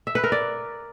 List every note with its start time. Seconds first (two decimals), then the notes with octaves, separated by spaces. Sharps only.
0.07 E5
0.15 B4
0.24 A#4
0.32 D5